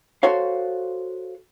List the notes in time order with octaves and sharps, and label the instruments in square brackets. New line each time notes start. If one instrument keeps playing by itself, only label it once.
[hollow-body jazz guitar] F#4 A4 C5 C#5 F5